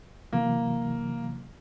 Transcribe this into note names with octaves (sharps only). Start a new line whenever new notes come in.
C3 E3 F#3 A#3